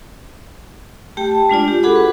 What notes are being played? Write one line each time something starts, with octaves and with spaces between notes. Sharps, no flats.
A3 G4 G5
A5
G#3 D4 F4 D5
G4
F#4 G#4 A4 F#5 B5 D6
B4